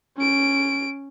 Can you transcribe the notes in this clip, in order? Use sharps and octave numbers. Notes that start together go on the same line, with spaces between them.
C#4 D7